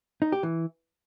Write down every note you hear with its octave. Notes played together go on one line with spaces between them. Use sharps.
D#4
G4
E3